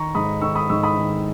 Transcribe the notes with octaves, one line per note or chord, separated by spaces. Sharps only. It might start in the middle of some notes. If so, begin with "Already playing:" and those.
Already playing: D#3 A#5 C#6
G#2 B5 D#6
D#3 C#6 E6
B5 D#6
G#2 C#6 E6
B5 D#6
D#3